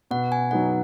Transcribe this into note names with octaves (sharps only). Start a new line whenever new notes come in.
B2 F#5
G#5
F#3 B3 D#4 F#5